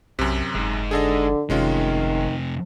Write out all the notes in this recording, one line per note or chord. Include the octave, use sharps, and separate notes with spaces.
B1 F#2 C3
F#1 G#3 D#4
D3 G#4 A4 D#5
F#1 F2 C3 D#3 G#3 C#4 F4